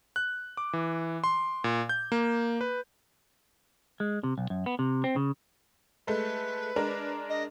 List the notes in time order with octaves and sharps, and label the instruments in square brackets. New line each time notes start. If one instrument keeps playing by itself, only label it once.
[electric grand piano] F#6
D6
E3
C6
A#2
G6
A#3
B4
[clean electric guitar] G#3
C3
B1
F#2
B3
C3
C4
C#3
[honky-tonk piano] G#3 A3 [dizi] B4
[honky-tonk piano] G#3 D4 A#4
[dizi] D#5